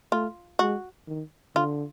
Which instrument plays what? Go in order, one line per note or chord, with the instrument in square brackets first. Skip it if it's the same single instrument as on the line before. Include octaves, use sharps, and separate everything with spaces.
[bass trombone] A3 [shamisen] F4
[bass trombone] G#3 [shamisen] F#4
[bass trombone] D#3
[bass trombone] D3 [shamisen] F4